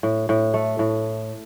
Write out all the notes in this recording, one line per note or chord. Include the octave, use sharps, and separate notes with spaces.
A2
A2
A3
A2